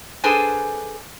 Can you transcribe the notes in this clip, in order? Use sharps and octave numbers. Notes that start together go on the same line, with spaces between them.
D4 G#4 A4 B4 C5 G#5